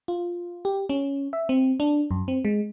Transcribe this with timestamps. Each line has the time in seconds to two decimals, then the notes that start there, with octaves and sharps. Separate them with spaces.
0.08 F4
0.65 G4
0.89 C#4
1.33 E5
1.49 C4
1.80 D4
2.11 F#2
2.28 C4
2.45 G#3